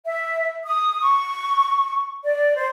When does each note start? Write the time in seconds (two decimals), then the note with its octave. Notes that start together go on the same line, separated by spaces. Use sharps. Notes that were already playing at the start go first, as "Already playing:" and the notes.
0.06 E5
0.67 D#6
1.01 C#6
2.25 D5
2.57 C5